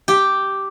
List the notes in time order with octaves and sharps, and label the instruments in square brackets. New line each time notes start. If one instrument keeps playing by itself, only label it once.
[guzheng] G4